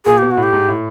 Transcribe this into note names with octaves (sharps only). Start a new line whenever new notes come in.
A#2 G#4
B2 G4
F#4
A2
G4
G#2
A2